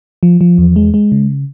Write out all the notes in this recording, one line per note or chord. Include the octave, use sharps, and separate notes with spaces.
F3
F3
E2
G#3
G#3
C#3